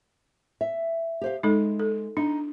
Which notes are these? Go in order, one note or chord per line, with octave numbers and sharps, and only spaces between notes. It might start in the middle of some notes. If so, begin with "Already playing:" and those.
E5
G4 C5 F5
G#3 D#4 A4
A4
D4 D#4